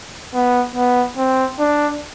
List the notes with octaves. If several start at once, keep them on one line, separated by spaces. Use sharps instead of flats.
B3
B3
C4
D4